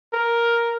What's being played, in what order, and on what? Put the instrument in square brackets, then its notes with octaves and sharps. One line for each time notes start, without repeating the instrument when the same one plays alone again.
[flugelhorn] A#4